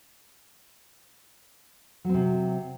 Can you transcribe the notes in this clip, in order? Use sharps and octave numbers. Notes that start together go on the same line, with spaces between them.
C3 F#3 C4